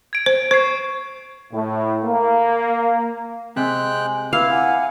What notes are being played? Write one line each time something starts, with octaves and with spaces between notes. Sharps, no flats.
G#6 D7
C5
C5 C#6 G#6 C7
A2
A#3
C3 G#3 G5 F#6
E4 B4 F5 D6 E6
F#5 G#5